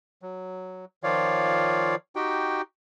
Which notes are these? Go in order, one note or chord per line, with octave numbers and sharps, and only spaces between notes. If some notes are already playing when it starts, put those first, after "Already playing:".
F#3
D#3 F3 F4 C#5 D5 F5
D#4 F#4 G4 G5